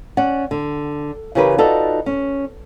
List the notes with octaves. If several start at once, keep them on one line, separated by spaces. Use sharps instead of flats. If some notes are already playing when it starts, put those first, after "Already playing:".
C#4 D5 F#5
D3
C#3 E3 C#4 G4 A#4 B4
D#4 F4 F#4 A4 B4 D5
C#4